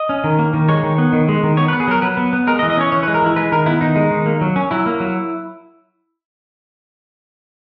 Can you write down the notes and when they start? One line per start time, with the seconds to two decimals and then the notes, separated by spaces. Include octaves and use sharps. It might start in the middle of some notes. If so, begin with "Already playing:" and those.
Already playing: D#5
0.09 C#4
0.24 D#3
0.39 A#3
0.54 D#3
0.69 G#3 C#5
0.83 D#3
0.98 B3
1.12 D#3
1.29 G#3
1.43 D#3
1.57 B3 C#5
1.68 B4
1.73 B3
1.80 G#4
1.88 F#3 A#4
2.02 F#3 B4
2.17 B3
2.33 B3
2.47 G#3 A#4
2.59 D#5
2.63 E3
2.70 D#5
2.77 C#4 C#5
2.92 E3 C#5
3.03 B4
3.08 G#3
3.14 A#4
3.22 E3 E4
3.36 G#3 B4
3.52 D#3 A#4
3.66 B3 E4
3.81 D#3 D#4
3.96 G#3
4.11 D#3
4.26 A#3
4.41 F#3
4.56 C#4
4.71 F#3 E4
4.86 A#3
5.00 F#3